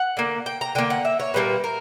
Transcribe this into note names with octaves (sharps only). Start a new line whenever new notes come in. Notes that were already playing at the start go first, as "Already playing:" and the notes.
Already playing: F#5
D3 A#3
G5
A#5
D3 A#3 G5
F#5
E5
C#5
A#2 G3 A#3 B4
A#4